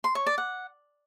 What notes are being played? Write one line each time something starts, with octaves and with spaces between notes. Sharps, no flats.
C6
C#5
D5
F#5